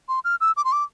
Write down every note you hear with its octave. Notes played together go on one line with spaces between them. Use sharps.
C6
F6
E6
D6
C6
D6